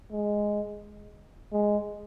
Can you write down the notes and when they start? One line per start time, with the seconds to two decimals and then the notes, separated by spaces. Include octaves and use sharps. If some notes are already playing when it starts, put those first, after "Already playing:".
0.12 G#3
1.52 G#3